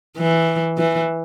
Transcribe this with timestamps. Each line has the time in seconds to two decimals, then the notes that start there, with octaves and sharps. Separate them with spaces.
0.18 E3
0.78 E3